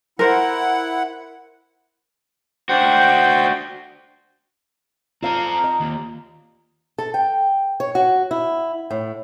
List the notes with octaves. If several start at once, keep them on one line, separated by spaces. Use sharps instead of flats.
E4 A#4 C5 F#5
D4 F#4 C5 G5
C4 F4 A4 D5 F5 A#5
D#5
D#2
A4
G5
C#5
F#4
E4
A2